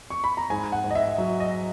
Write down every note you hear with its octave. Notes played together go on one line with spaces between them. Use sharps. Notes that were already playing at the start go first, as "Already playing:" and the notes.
C#6
B5
A#5
G#2 G#5
F#5
G#2
D#5
E5
F#3
D#5